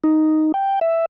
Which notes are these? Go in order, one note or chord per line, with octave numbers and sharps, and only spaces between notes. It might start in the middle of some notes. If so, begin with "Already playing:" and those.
D#4
G5
E5